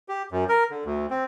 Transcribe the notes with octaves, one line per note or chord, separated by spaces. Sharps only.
G4
F#2
A#4
D3
D2
C4